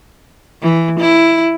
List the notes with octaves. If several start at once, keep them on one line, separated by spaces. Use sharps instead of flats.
E3
E4